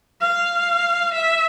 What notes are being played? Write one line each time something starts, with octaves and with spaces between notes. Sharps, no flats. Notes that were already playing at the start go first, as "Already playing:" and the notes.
F5
E5